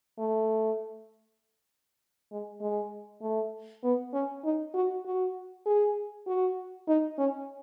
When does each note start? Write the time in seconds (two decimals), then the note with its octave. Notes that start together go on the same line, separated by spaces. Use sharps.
0.19 A3
2.32 G#3
2.61 G#3
3.22 A3
3.84 B3
4.13 C#4
4.45 D#4
4.74 F#4
5.05 F#4
5.66 G#4
6.27 F#4
6.88 D#4
7.18 C#4